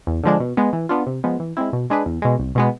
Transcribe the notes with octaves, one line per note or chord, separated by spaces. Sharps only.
E2
D3 F3 G#3 D4
B2
G#3 B3
E3
B3 D4 F4
C3
F3 G#3 B3
E3
G#3 C4 E4
B2
G#3 D4 G#4 B4
E2
B2 G#3
C2
B2 G#3 B3